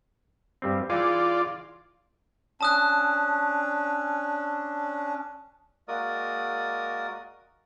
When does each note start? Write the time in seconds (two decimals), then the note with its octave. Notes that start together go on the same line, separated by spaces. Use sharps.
0.62 G2 G3 C4
0.90 E3 D#4 F4 G#4 D5
2.61 C#4 D4 A5 D#6 F#6
5.88 G#3 A#3 F#4 A#4 D5 D#6